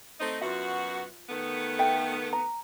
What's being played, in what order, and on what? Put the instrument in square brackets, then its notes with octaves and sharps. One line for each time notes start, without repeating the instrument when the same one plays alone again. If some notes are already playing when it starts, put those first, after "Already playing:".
[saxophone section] A3 C4 D#4
[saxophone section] F#2 B3 F#4 [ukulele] F4 E5
[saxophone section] D#3 A3 B3
[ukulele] A4 E5 G5
A#5